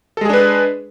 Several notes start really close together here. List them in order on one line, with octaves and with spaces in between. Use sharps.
A4 G#3 G#4 D4 B4